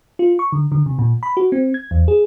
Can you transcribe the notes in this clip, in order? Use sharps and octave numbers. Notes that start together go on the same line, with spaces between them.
F4
C#6
D3
D3
C3
A#2
B5
F#4
C4
G#6
E2
G#4